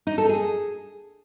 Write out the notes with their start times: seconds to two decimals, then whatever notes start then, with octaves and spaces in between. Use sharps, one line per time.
0.07 D#4
0.18 A4
0.29 G#4